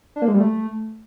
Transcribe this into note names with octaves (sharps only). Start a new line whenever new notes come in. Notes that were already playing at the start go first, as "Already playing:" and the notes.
D4
A#3
G#3
G3
A3